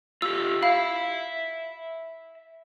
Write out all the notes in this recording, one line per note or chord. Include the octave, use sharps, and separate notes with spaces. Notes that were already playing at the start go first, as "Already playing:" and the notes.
F4 G4 E6
E5 F5 B5